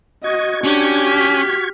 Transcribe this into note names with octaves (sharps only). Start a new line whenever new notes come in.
F#4 D#5 G#6
C#4 D4 G4
F6 B6